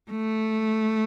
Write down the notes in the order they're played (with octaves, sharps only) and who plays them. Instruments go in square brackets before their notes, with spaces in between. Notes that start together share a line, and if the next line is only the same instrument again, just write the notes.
[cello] A3